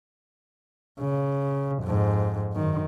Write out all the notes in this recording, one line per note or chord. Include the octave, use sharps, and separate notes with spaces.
C#3
F2 G#2
F#2 D#3